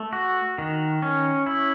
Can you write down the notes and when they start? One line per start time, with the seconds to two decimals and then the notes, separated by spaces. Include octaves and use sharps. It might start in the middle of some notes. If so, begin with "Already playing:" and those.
Already playing: A3
0.13 F#4
0.58 D#3
1.02 C#4
1.46 E4